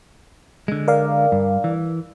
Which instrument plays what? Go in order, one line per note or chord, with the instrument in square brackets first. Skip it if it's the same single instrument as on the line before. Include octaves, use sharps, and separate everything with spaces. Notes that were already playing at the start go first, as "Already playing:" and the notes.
[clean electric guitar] D3 G#3
[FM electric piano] A#4 D5 F5
[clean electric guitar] G2
E3